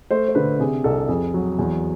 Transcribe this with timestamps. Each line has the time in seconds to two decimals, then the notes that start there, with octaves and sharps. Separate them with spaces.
0.11 A3 C5
0.28 C5
0.35 D3 B4
0.59 C3 G#4
0.84 C2 A4
1.08 F2 G#4
1.34 F#3
1.59 E2